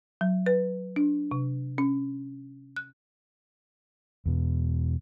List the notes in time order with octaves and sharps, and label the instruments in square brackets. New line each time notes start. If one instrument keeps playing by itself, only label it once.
[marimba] F#3
B4
D4
C3
C#4
F#6
[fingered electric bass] E2 B2